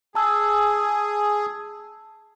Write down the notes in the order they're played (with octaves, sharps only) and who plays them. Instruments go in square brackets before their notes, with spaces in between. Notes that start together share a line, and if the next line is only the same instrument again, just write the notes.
[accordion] G#4 [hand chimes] A5 E6